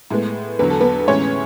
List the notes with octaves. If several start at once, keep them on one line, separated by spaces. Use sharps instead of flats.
A2 G#3 B3
E2 D3 F#3 B4
A4
B3 B4
A2 E3 G#3 C#4 C#5